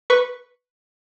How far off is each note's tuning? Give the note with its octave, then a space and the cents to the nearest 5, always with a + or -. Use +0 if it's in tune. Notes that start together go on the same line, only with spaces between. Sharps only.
B4 +0 C#6 -5